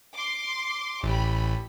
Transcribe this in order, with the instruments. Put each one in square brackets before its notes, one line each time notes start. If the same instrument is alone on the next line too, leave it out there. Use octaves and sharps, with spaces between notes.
[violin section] C6 D6
[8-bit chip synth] A1 [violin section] G4 B5